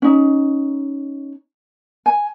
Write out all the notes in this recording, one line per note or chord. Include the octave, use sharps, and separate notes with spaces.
C#4 D#4
G#5